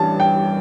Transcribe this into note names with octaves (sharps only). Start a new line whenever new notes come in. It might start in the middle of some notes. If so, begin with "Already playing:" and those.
Already playing: A1 G2 A5
G5